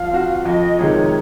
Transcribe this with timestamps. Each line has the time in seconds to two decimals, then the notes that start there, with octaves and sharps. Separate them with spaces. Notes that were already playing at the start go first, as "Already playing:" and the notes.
Already playing: F3 F5
0.11 C4 F#4
0.45 F2 D#5
0.78 C3 D#3 G#3 D#4 C#5